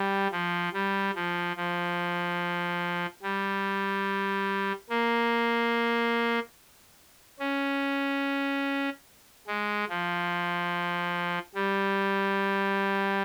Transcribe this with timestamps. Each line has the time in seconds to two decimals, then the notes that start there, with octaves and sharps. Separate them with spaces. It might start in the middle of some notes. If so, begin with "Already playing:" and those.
Already playing: G3
0.32 F3
0.74 G3
1.16 F3
1.57 F3
3.23 G3
4.90 A#3
7.40 C#4
9.47 G#3
9.89 F3
11.55 G3